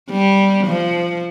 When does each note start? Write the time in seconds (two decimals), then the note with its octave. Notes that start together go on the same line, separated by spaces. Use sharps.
0.10 G3
0.66 F3